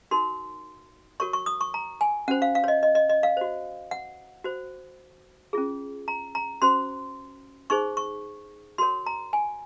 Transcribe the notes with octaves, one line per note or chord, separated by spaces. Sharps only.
D#4 F#4 A#4 C6
F#4 A#4 C#5 C#6
C#6
D#6
C#6
A#5
G#5
C#4 F#4 C5 F#5
F5
F5
C#5
D#5
D#5
D#5
D#5
F5
F#4 C5
F#5
F#4 C5
C#4 F4 G#4
A#5
A#5
C#4 F#4 C5 C6
D#4 G#4 C5 C#6
C#6
F#4 A#4 C#5 C6
A#5
G#5